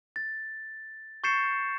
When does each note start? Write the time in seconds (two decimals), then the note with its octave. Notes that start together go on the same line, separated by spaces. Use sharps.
0.16 A6
1.24 C#6 G6 A6 C7 C#7 E7